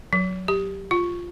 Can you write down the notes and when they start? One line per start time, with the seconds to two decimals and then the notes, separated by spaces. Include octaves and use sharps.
0.13 F#3
0.48 G4
0.91 F4